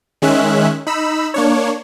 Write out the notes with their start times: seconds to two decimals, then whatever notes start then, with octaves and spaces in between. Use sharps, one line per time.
0.22 D#3 G#3 C#4 E5 F#6
0.87 D#4 B5 E6
1.34 A#3 D4 C#5